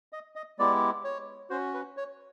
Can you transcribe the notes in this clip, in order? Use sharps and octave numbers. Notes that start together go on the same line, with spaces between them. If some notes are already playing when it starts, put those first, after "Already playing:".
D#5
D#5
G#3 B3 E4 G4 D5
C#5
C#4 F#4 C5
B4
C#5